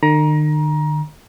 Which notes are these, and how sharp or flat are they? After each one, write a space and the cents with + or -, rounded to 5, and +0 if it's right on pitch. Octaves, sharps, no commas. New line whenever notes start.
D#3 -45 A#5 +25